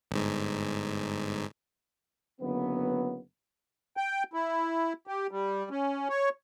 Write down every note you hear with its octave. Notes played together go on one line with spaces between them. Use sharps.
G1 G#2
F#1 D3 F#3 B3
G5
E4
G4
G3
C#4
C#5